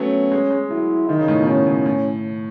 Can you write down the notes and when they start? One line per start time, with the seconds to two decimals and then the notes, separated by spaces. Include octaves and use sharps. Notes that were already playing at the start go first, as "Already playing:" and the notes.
Already playing: F#3 A3 B3 C#4
0.32 G#3
0.51 G#3
0.70 F#3 E4
1.09 D#3 D#4
1.19 C#3
1.28 A2
1.38 B2
1.47 A2 C#4
1.67 A2
1.86 A2